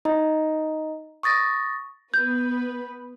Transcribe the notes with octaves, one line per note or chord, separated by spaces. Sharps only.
D#4 D#5 A#5
C#6 D#6 A6 A#6
B3 B4 G6